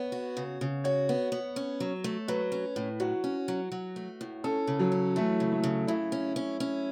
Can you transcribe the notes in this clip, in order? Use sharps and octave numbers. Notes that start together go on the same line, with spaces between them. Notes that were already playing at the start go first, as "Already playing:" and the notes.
Already playing: B3 C#5
F#4
C#3
C#3
F#4 C#5
B3
B3
C#4
F#3
A3
F#3 B4
C#4
A2
F#3 F#4
C#4
F#3
F#3
A3
A2
C#4 A4
C#3
F#3
C#4
E3 A3
C#3
A3
C#3
C#3 E4
C#4
C#4
C#4